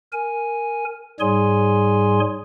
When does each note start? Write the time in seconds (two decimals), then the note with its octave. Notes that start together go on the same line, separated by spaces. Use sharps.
0.12 A#4 G#5
1.20 G#2 G3 G#4 C#5 G#5 C6